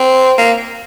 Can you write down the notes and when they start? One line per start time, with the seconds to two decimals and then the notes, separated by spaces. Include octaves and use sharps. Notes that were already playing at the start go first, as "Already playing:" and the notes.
Already playing: C4
0.38 A#3